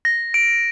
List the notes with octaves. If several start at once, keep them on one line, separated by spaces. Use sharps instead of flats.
A#6
D7